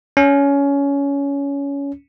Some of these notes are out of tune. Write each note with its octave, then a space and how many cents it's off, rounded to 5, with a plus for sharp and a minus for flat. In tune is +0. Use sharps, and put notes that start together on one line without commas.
C#4 +20